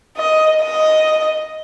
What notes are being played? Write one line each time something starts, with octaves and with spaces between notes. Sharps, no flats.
D#5
D#5